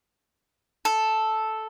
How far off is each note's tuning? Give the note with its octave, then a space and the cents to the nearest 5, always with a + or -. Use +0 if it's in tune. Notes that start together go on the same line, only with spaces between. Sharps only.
A4 -5